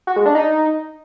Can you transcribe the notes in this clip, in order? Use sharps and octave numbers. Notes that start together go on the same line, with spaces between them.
F#4
G#3
D4
D#4